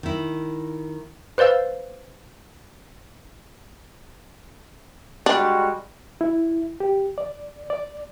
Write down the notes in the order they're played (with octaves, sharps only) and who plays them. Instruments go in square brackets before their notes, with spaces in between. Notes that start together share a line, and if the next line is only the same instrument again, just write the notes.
[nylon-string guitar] D#3 E4
[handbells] B4 C5 D5 F5 E6
[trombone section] G3 G#3 F#4 [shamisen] D4
[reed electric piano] E4
G4
D5
D5